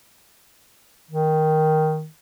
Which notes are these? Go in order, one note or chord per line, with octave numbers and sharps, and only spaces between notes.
D#3